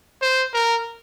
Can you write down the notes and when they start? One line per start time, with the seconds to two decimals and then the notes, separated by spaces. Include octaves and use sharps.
0.22 C5
0.54 A#4